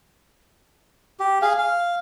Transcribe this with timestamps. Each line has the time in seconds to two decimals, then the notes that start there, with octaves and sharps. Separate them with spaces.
1.20 G4
1.42 G#4 F5
1.58 F5